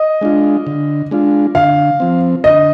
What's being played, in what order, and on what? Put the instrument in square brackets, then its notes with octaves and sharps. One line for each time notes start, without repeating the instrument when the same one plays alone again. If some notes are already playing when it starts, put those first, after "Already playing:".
Already playing: [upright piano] D#5
[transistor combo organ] G#3 D4 F4
D3
G#3 D4 F4
[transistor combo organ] D3 [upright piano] F5
[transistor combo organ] F3 C4
[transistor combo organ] D3 [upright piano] D#5